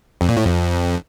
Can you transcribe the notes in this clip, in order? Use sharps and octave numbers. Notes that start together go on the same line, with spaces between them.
F2
A#2
A2
F2